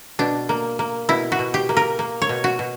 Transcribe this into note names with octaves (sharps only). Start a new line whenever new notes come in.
B2 D4
A#3
A#3
B2 E4
F#4
B2
G4
A#3
A#4
A#3
C#5
B2
F#4
B2